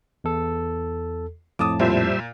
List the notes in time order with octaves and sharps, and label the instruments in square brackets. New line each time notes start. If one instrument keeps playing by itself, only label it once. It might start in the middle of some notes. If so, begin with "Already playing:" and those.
[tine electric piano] E2 A4
[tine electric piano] F2 A2 A5 [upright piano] D6 D#6
[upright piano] A#2 [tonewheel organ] G3 C5 E5